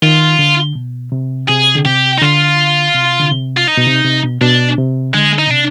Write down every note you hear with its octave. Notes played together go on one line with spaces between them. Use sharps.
D#3 F4
D3
B2
C3
C3 G#4
D3
C3 G4
D#4
D3 F4
C3
D3
C3
F4
D#4
B2
C3
C3
B2
B2 D4
C3
D3 G#3
D#4
B2
C3 D4